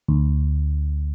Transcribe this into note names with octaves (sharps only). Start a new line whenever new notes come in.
D2